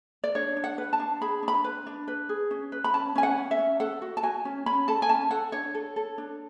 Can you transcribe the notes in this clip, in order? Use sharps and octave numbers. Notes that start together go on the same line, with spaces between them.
D5
D4 C#5
D4
F#5
B4
A5
D4
G#4 B5
D4
B5
B4
D4
B4
G#4
C#4
B4
B5
C#4 A5
C#4 G#5
F#5
C#4
E5
C#4
A4 F#5
F#4
A5
F#4 G#5
C#4
C#4 B5
A4 A5
G#5
C#4 A5
A4 F#5
D4 C#5
A4
A4
D4